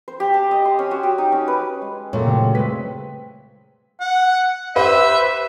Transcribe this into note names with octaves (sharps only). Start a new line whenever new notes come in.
C5
G4
A5
D#5
C6
C#4
F#4
G4
D#4
C#4
B4
G#3
A#2 F#3 A3 C4 G4 C#5
C#3
F3 G#3 C4 B4 B6
F#5
G4 B4 C5 E5